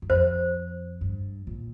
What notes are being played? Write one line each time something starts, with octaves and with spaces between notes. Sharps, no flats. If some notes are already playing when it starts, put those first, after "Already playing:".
G2
F2 C5
G2
A#2